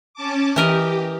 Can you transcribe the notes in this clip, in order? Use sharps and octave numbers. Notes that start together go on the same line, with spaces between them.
C#4 A5 D6
E3 G4 A#4 D#5